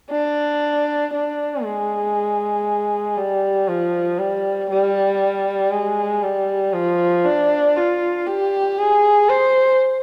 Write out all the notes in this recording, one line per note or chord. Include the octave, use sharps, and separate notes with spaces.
D4
D4
G#3
G3
F3
G3
G3
G#3
G3
F3
D4
F4
G4
G#4
C5